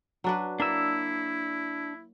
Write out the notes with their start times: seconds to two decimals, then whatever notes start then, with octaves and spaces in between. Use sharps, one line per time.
0.24 F#3 D4 B4
0.60 A#3 D4 E4 E6